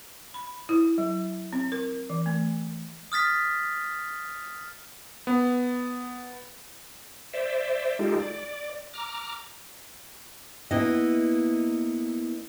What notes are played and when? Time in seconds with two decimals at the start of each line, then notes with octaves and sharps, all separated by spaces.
0.34 B5
0.69 E4
0.98 F#3
1.53 C4
1.72 A#4
2.10 E3
2.26 A3
3.12 D#6 F6 A6 B6
5.27 B3
7.33 C5 D5 E5
7.99 G#3 D#4 F4 G4 A4
8.20 D5
8.94 A#5 D6 F6
10.71 A#3 B3 E4 D#5